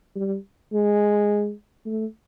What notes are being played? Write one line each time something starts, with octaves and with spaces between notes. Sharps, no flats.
G3
G#3
A3